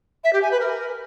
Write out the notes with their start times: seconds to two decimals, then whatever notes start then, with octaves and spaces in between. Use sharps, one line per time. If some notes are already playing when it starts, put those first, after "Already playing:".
0.24 E5
0.33 G4
0.42 G#5
0.51 B4
0.60 A#4